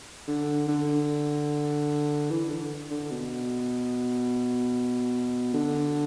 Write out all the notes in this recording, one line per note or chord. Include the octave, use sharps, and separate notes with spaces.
D3
D3
E3
D3
D3
B2
D3